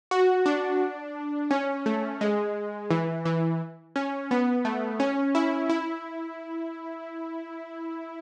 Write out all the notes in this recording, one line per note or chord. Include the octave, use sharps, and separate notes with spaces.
F#4
D4
C#4
A3
G#3
E3
E3
C#4
B3
A3
C#4
E4
E4